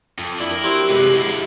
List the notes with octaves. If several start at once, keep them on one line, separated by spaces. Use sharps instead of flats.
F2
D4 E4
A#4
F#3 C4 E4 G4
F#2 C3 G#3 B4
G#3 E4